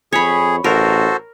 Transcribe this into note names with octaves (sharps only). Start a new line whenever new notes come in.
F2 G#4 C#5 B5
A1 F#4 A4 A#4 C5